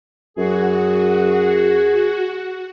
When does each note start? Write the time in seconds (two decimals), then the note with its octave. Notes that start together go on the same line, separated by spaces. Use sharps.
0.37 F#2 F#4 G#4